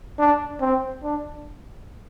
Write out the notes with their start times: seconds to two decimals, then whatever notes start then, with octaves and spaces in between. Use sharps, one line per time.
0.19 D4
0.61 C4
1.03 D4